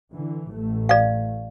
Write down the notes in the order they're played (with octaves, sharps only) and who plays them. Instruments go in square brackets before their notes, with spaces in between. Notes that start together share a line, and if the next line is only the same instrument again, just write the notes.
[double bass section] D3 E3
A1 A2 A3
[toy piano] D5 F5